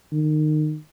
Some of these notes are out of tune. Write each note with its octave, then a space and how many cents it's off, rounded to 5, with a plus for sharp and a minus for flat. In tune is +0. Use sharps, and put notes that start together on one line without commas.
D#3 -25